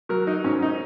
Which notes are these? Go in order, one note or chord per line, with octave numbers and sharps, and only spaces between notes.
F#3 A#4
D#4
G#2 C#4
D#4